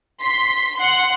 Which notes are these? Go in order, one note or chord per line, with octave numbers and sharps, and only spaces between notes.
C6 B6
F#5 C6